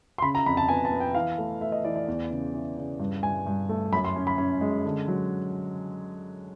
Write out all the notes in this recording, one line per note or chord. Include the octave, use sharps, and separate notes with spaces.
C6
C#3 B5
A#5
F2 B5
A5
B3 G#5
A5
B3
G5
E3 F5
A3
A3 E5
D#5
E3 D5
D5
E2
C#3
E3
C#3
G2
G2 G#5
G2
A3
F#2 B5
C6
C#4
B5
C#4
G#3
D3
F#3